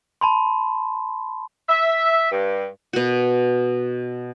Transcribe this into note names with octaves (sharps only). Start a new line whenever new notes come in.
A5 B5 C6
E5
G2
B2 F#4